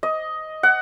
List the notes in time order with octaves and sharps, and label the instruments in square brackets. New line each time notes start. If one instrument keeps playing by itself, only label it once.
[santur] D#5
F#5